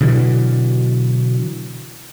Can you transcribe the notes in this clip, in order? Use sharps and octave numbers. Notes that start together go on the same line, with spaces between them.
B2 D3 E3 F#3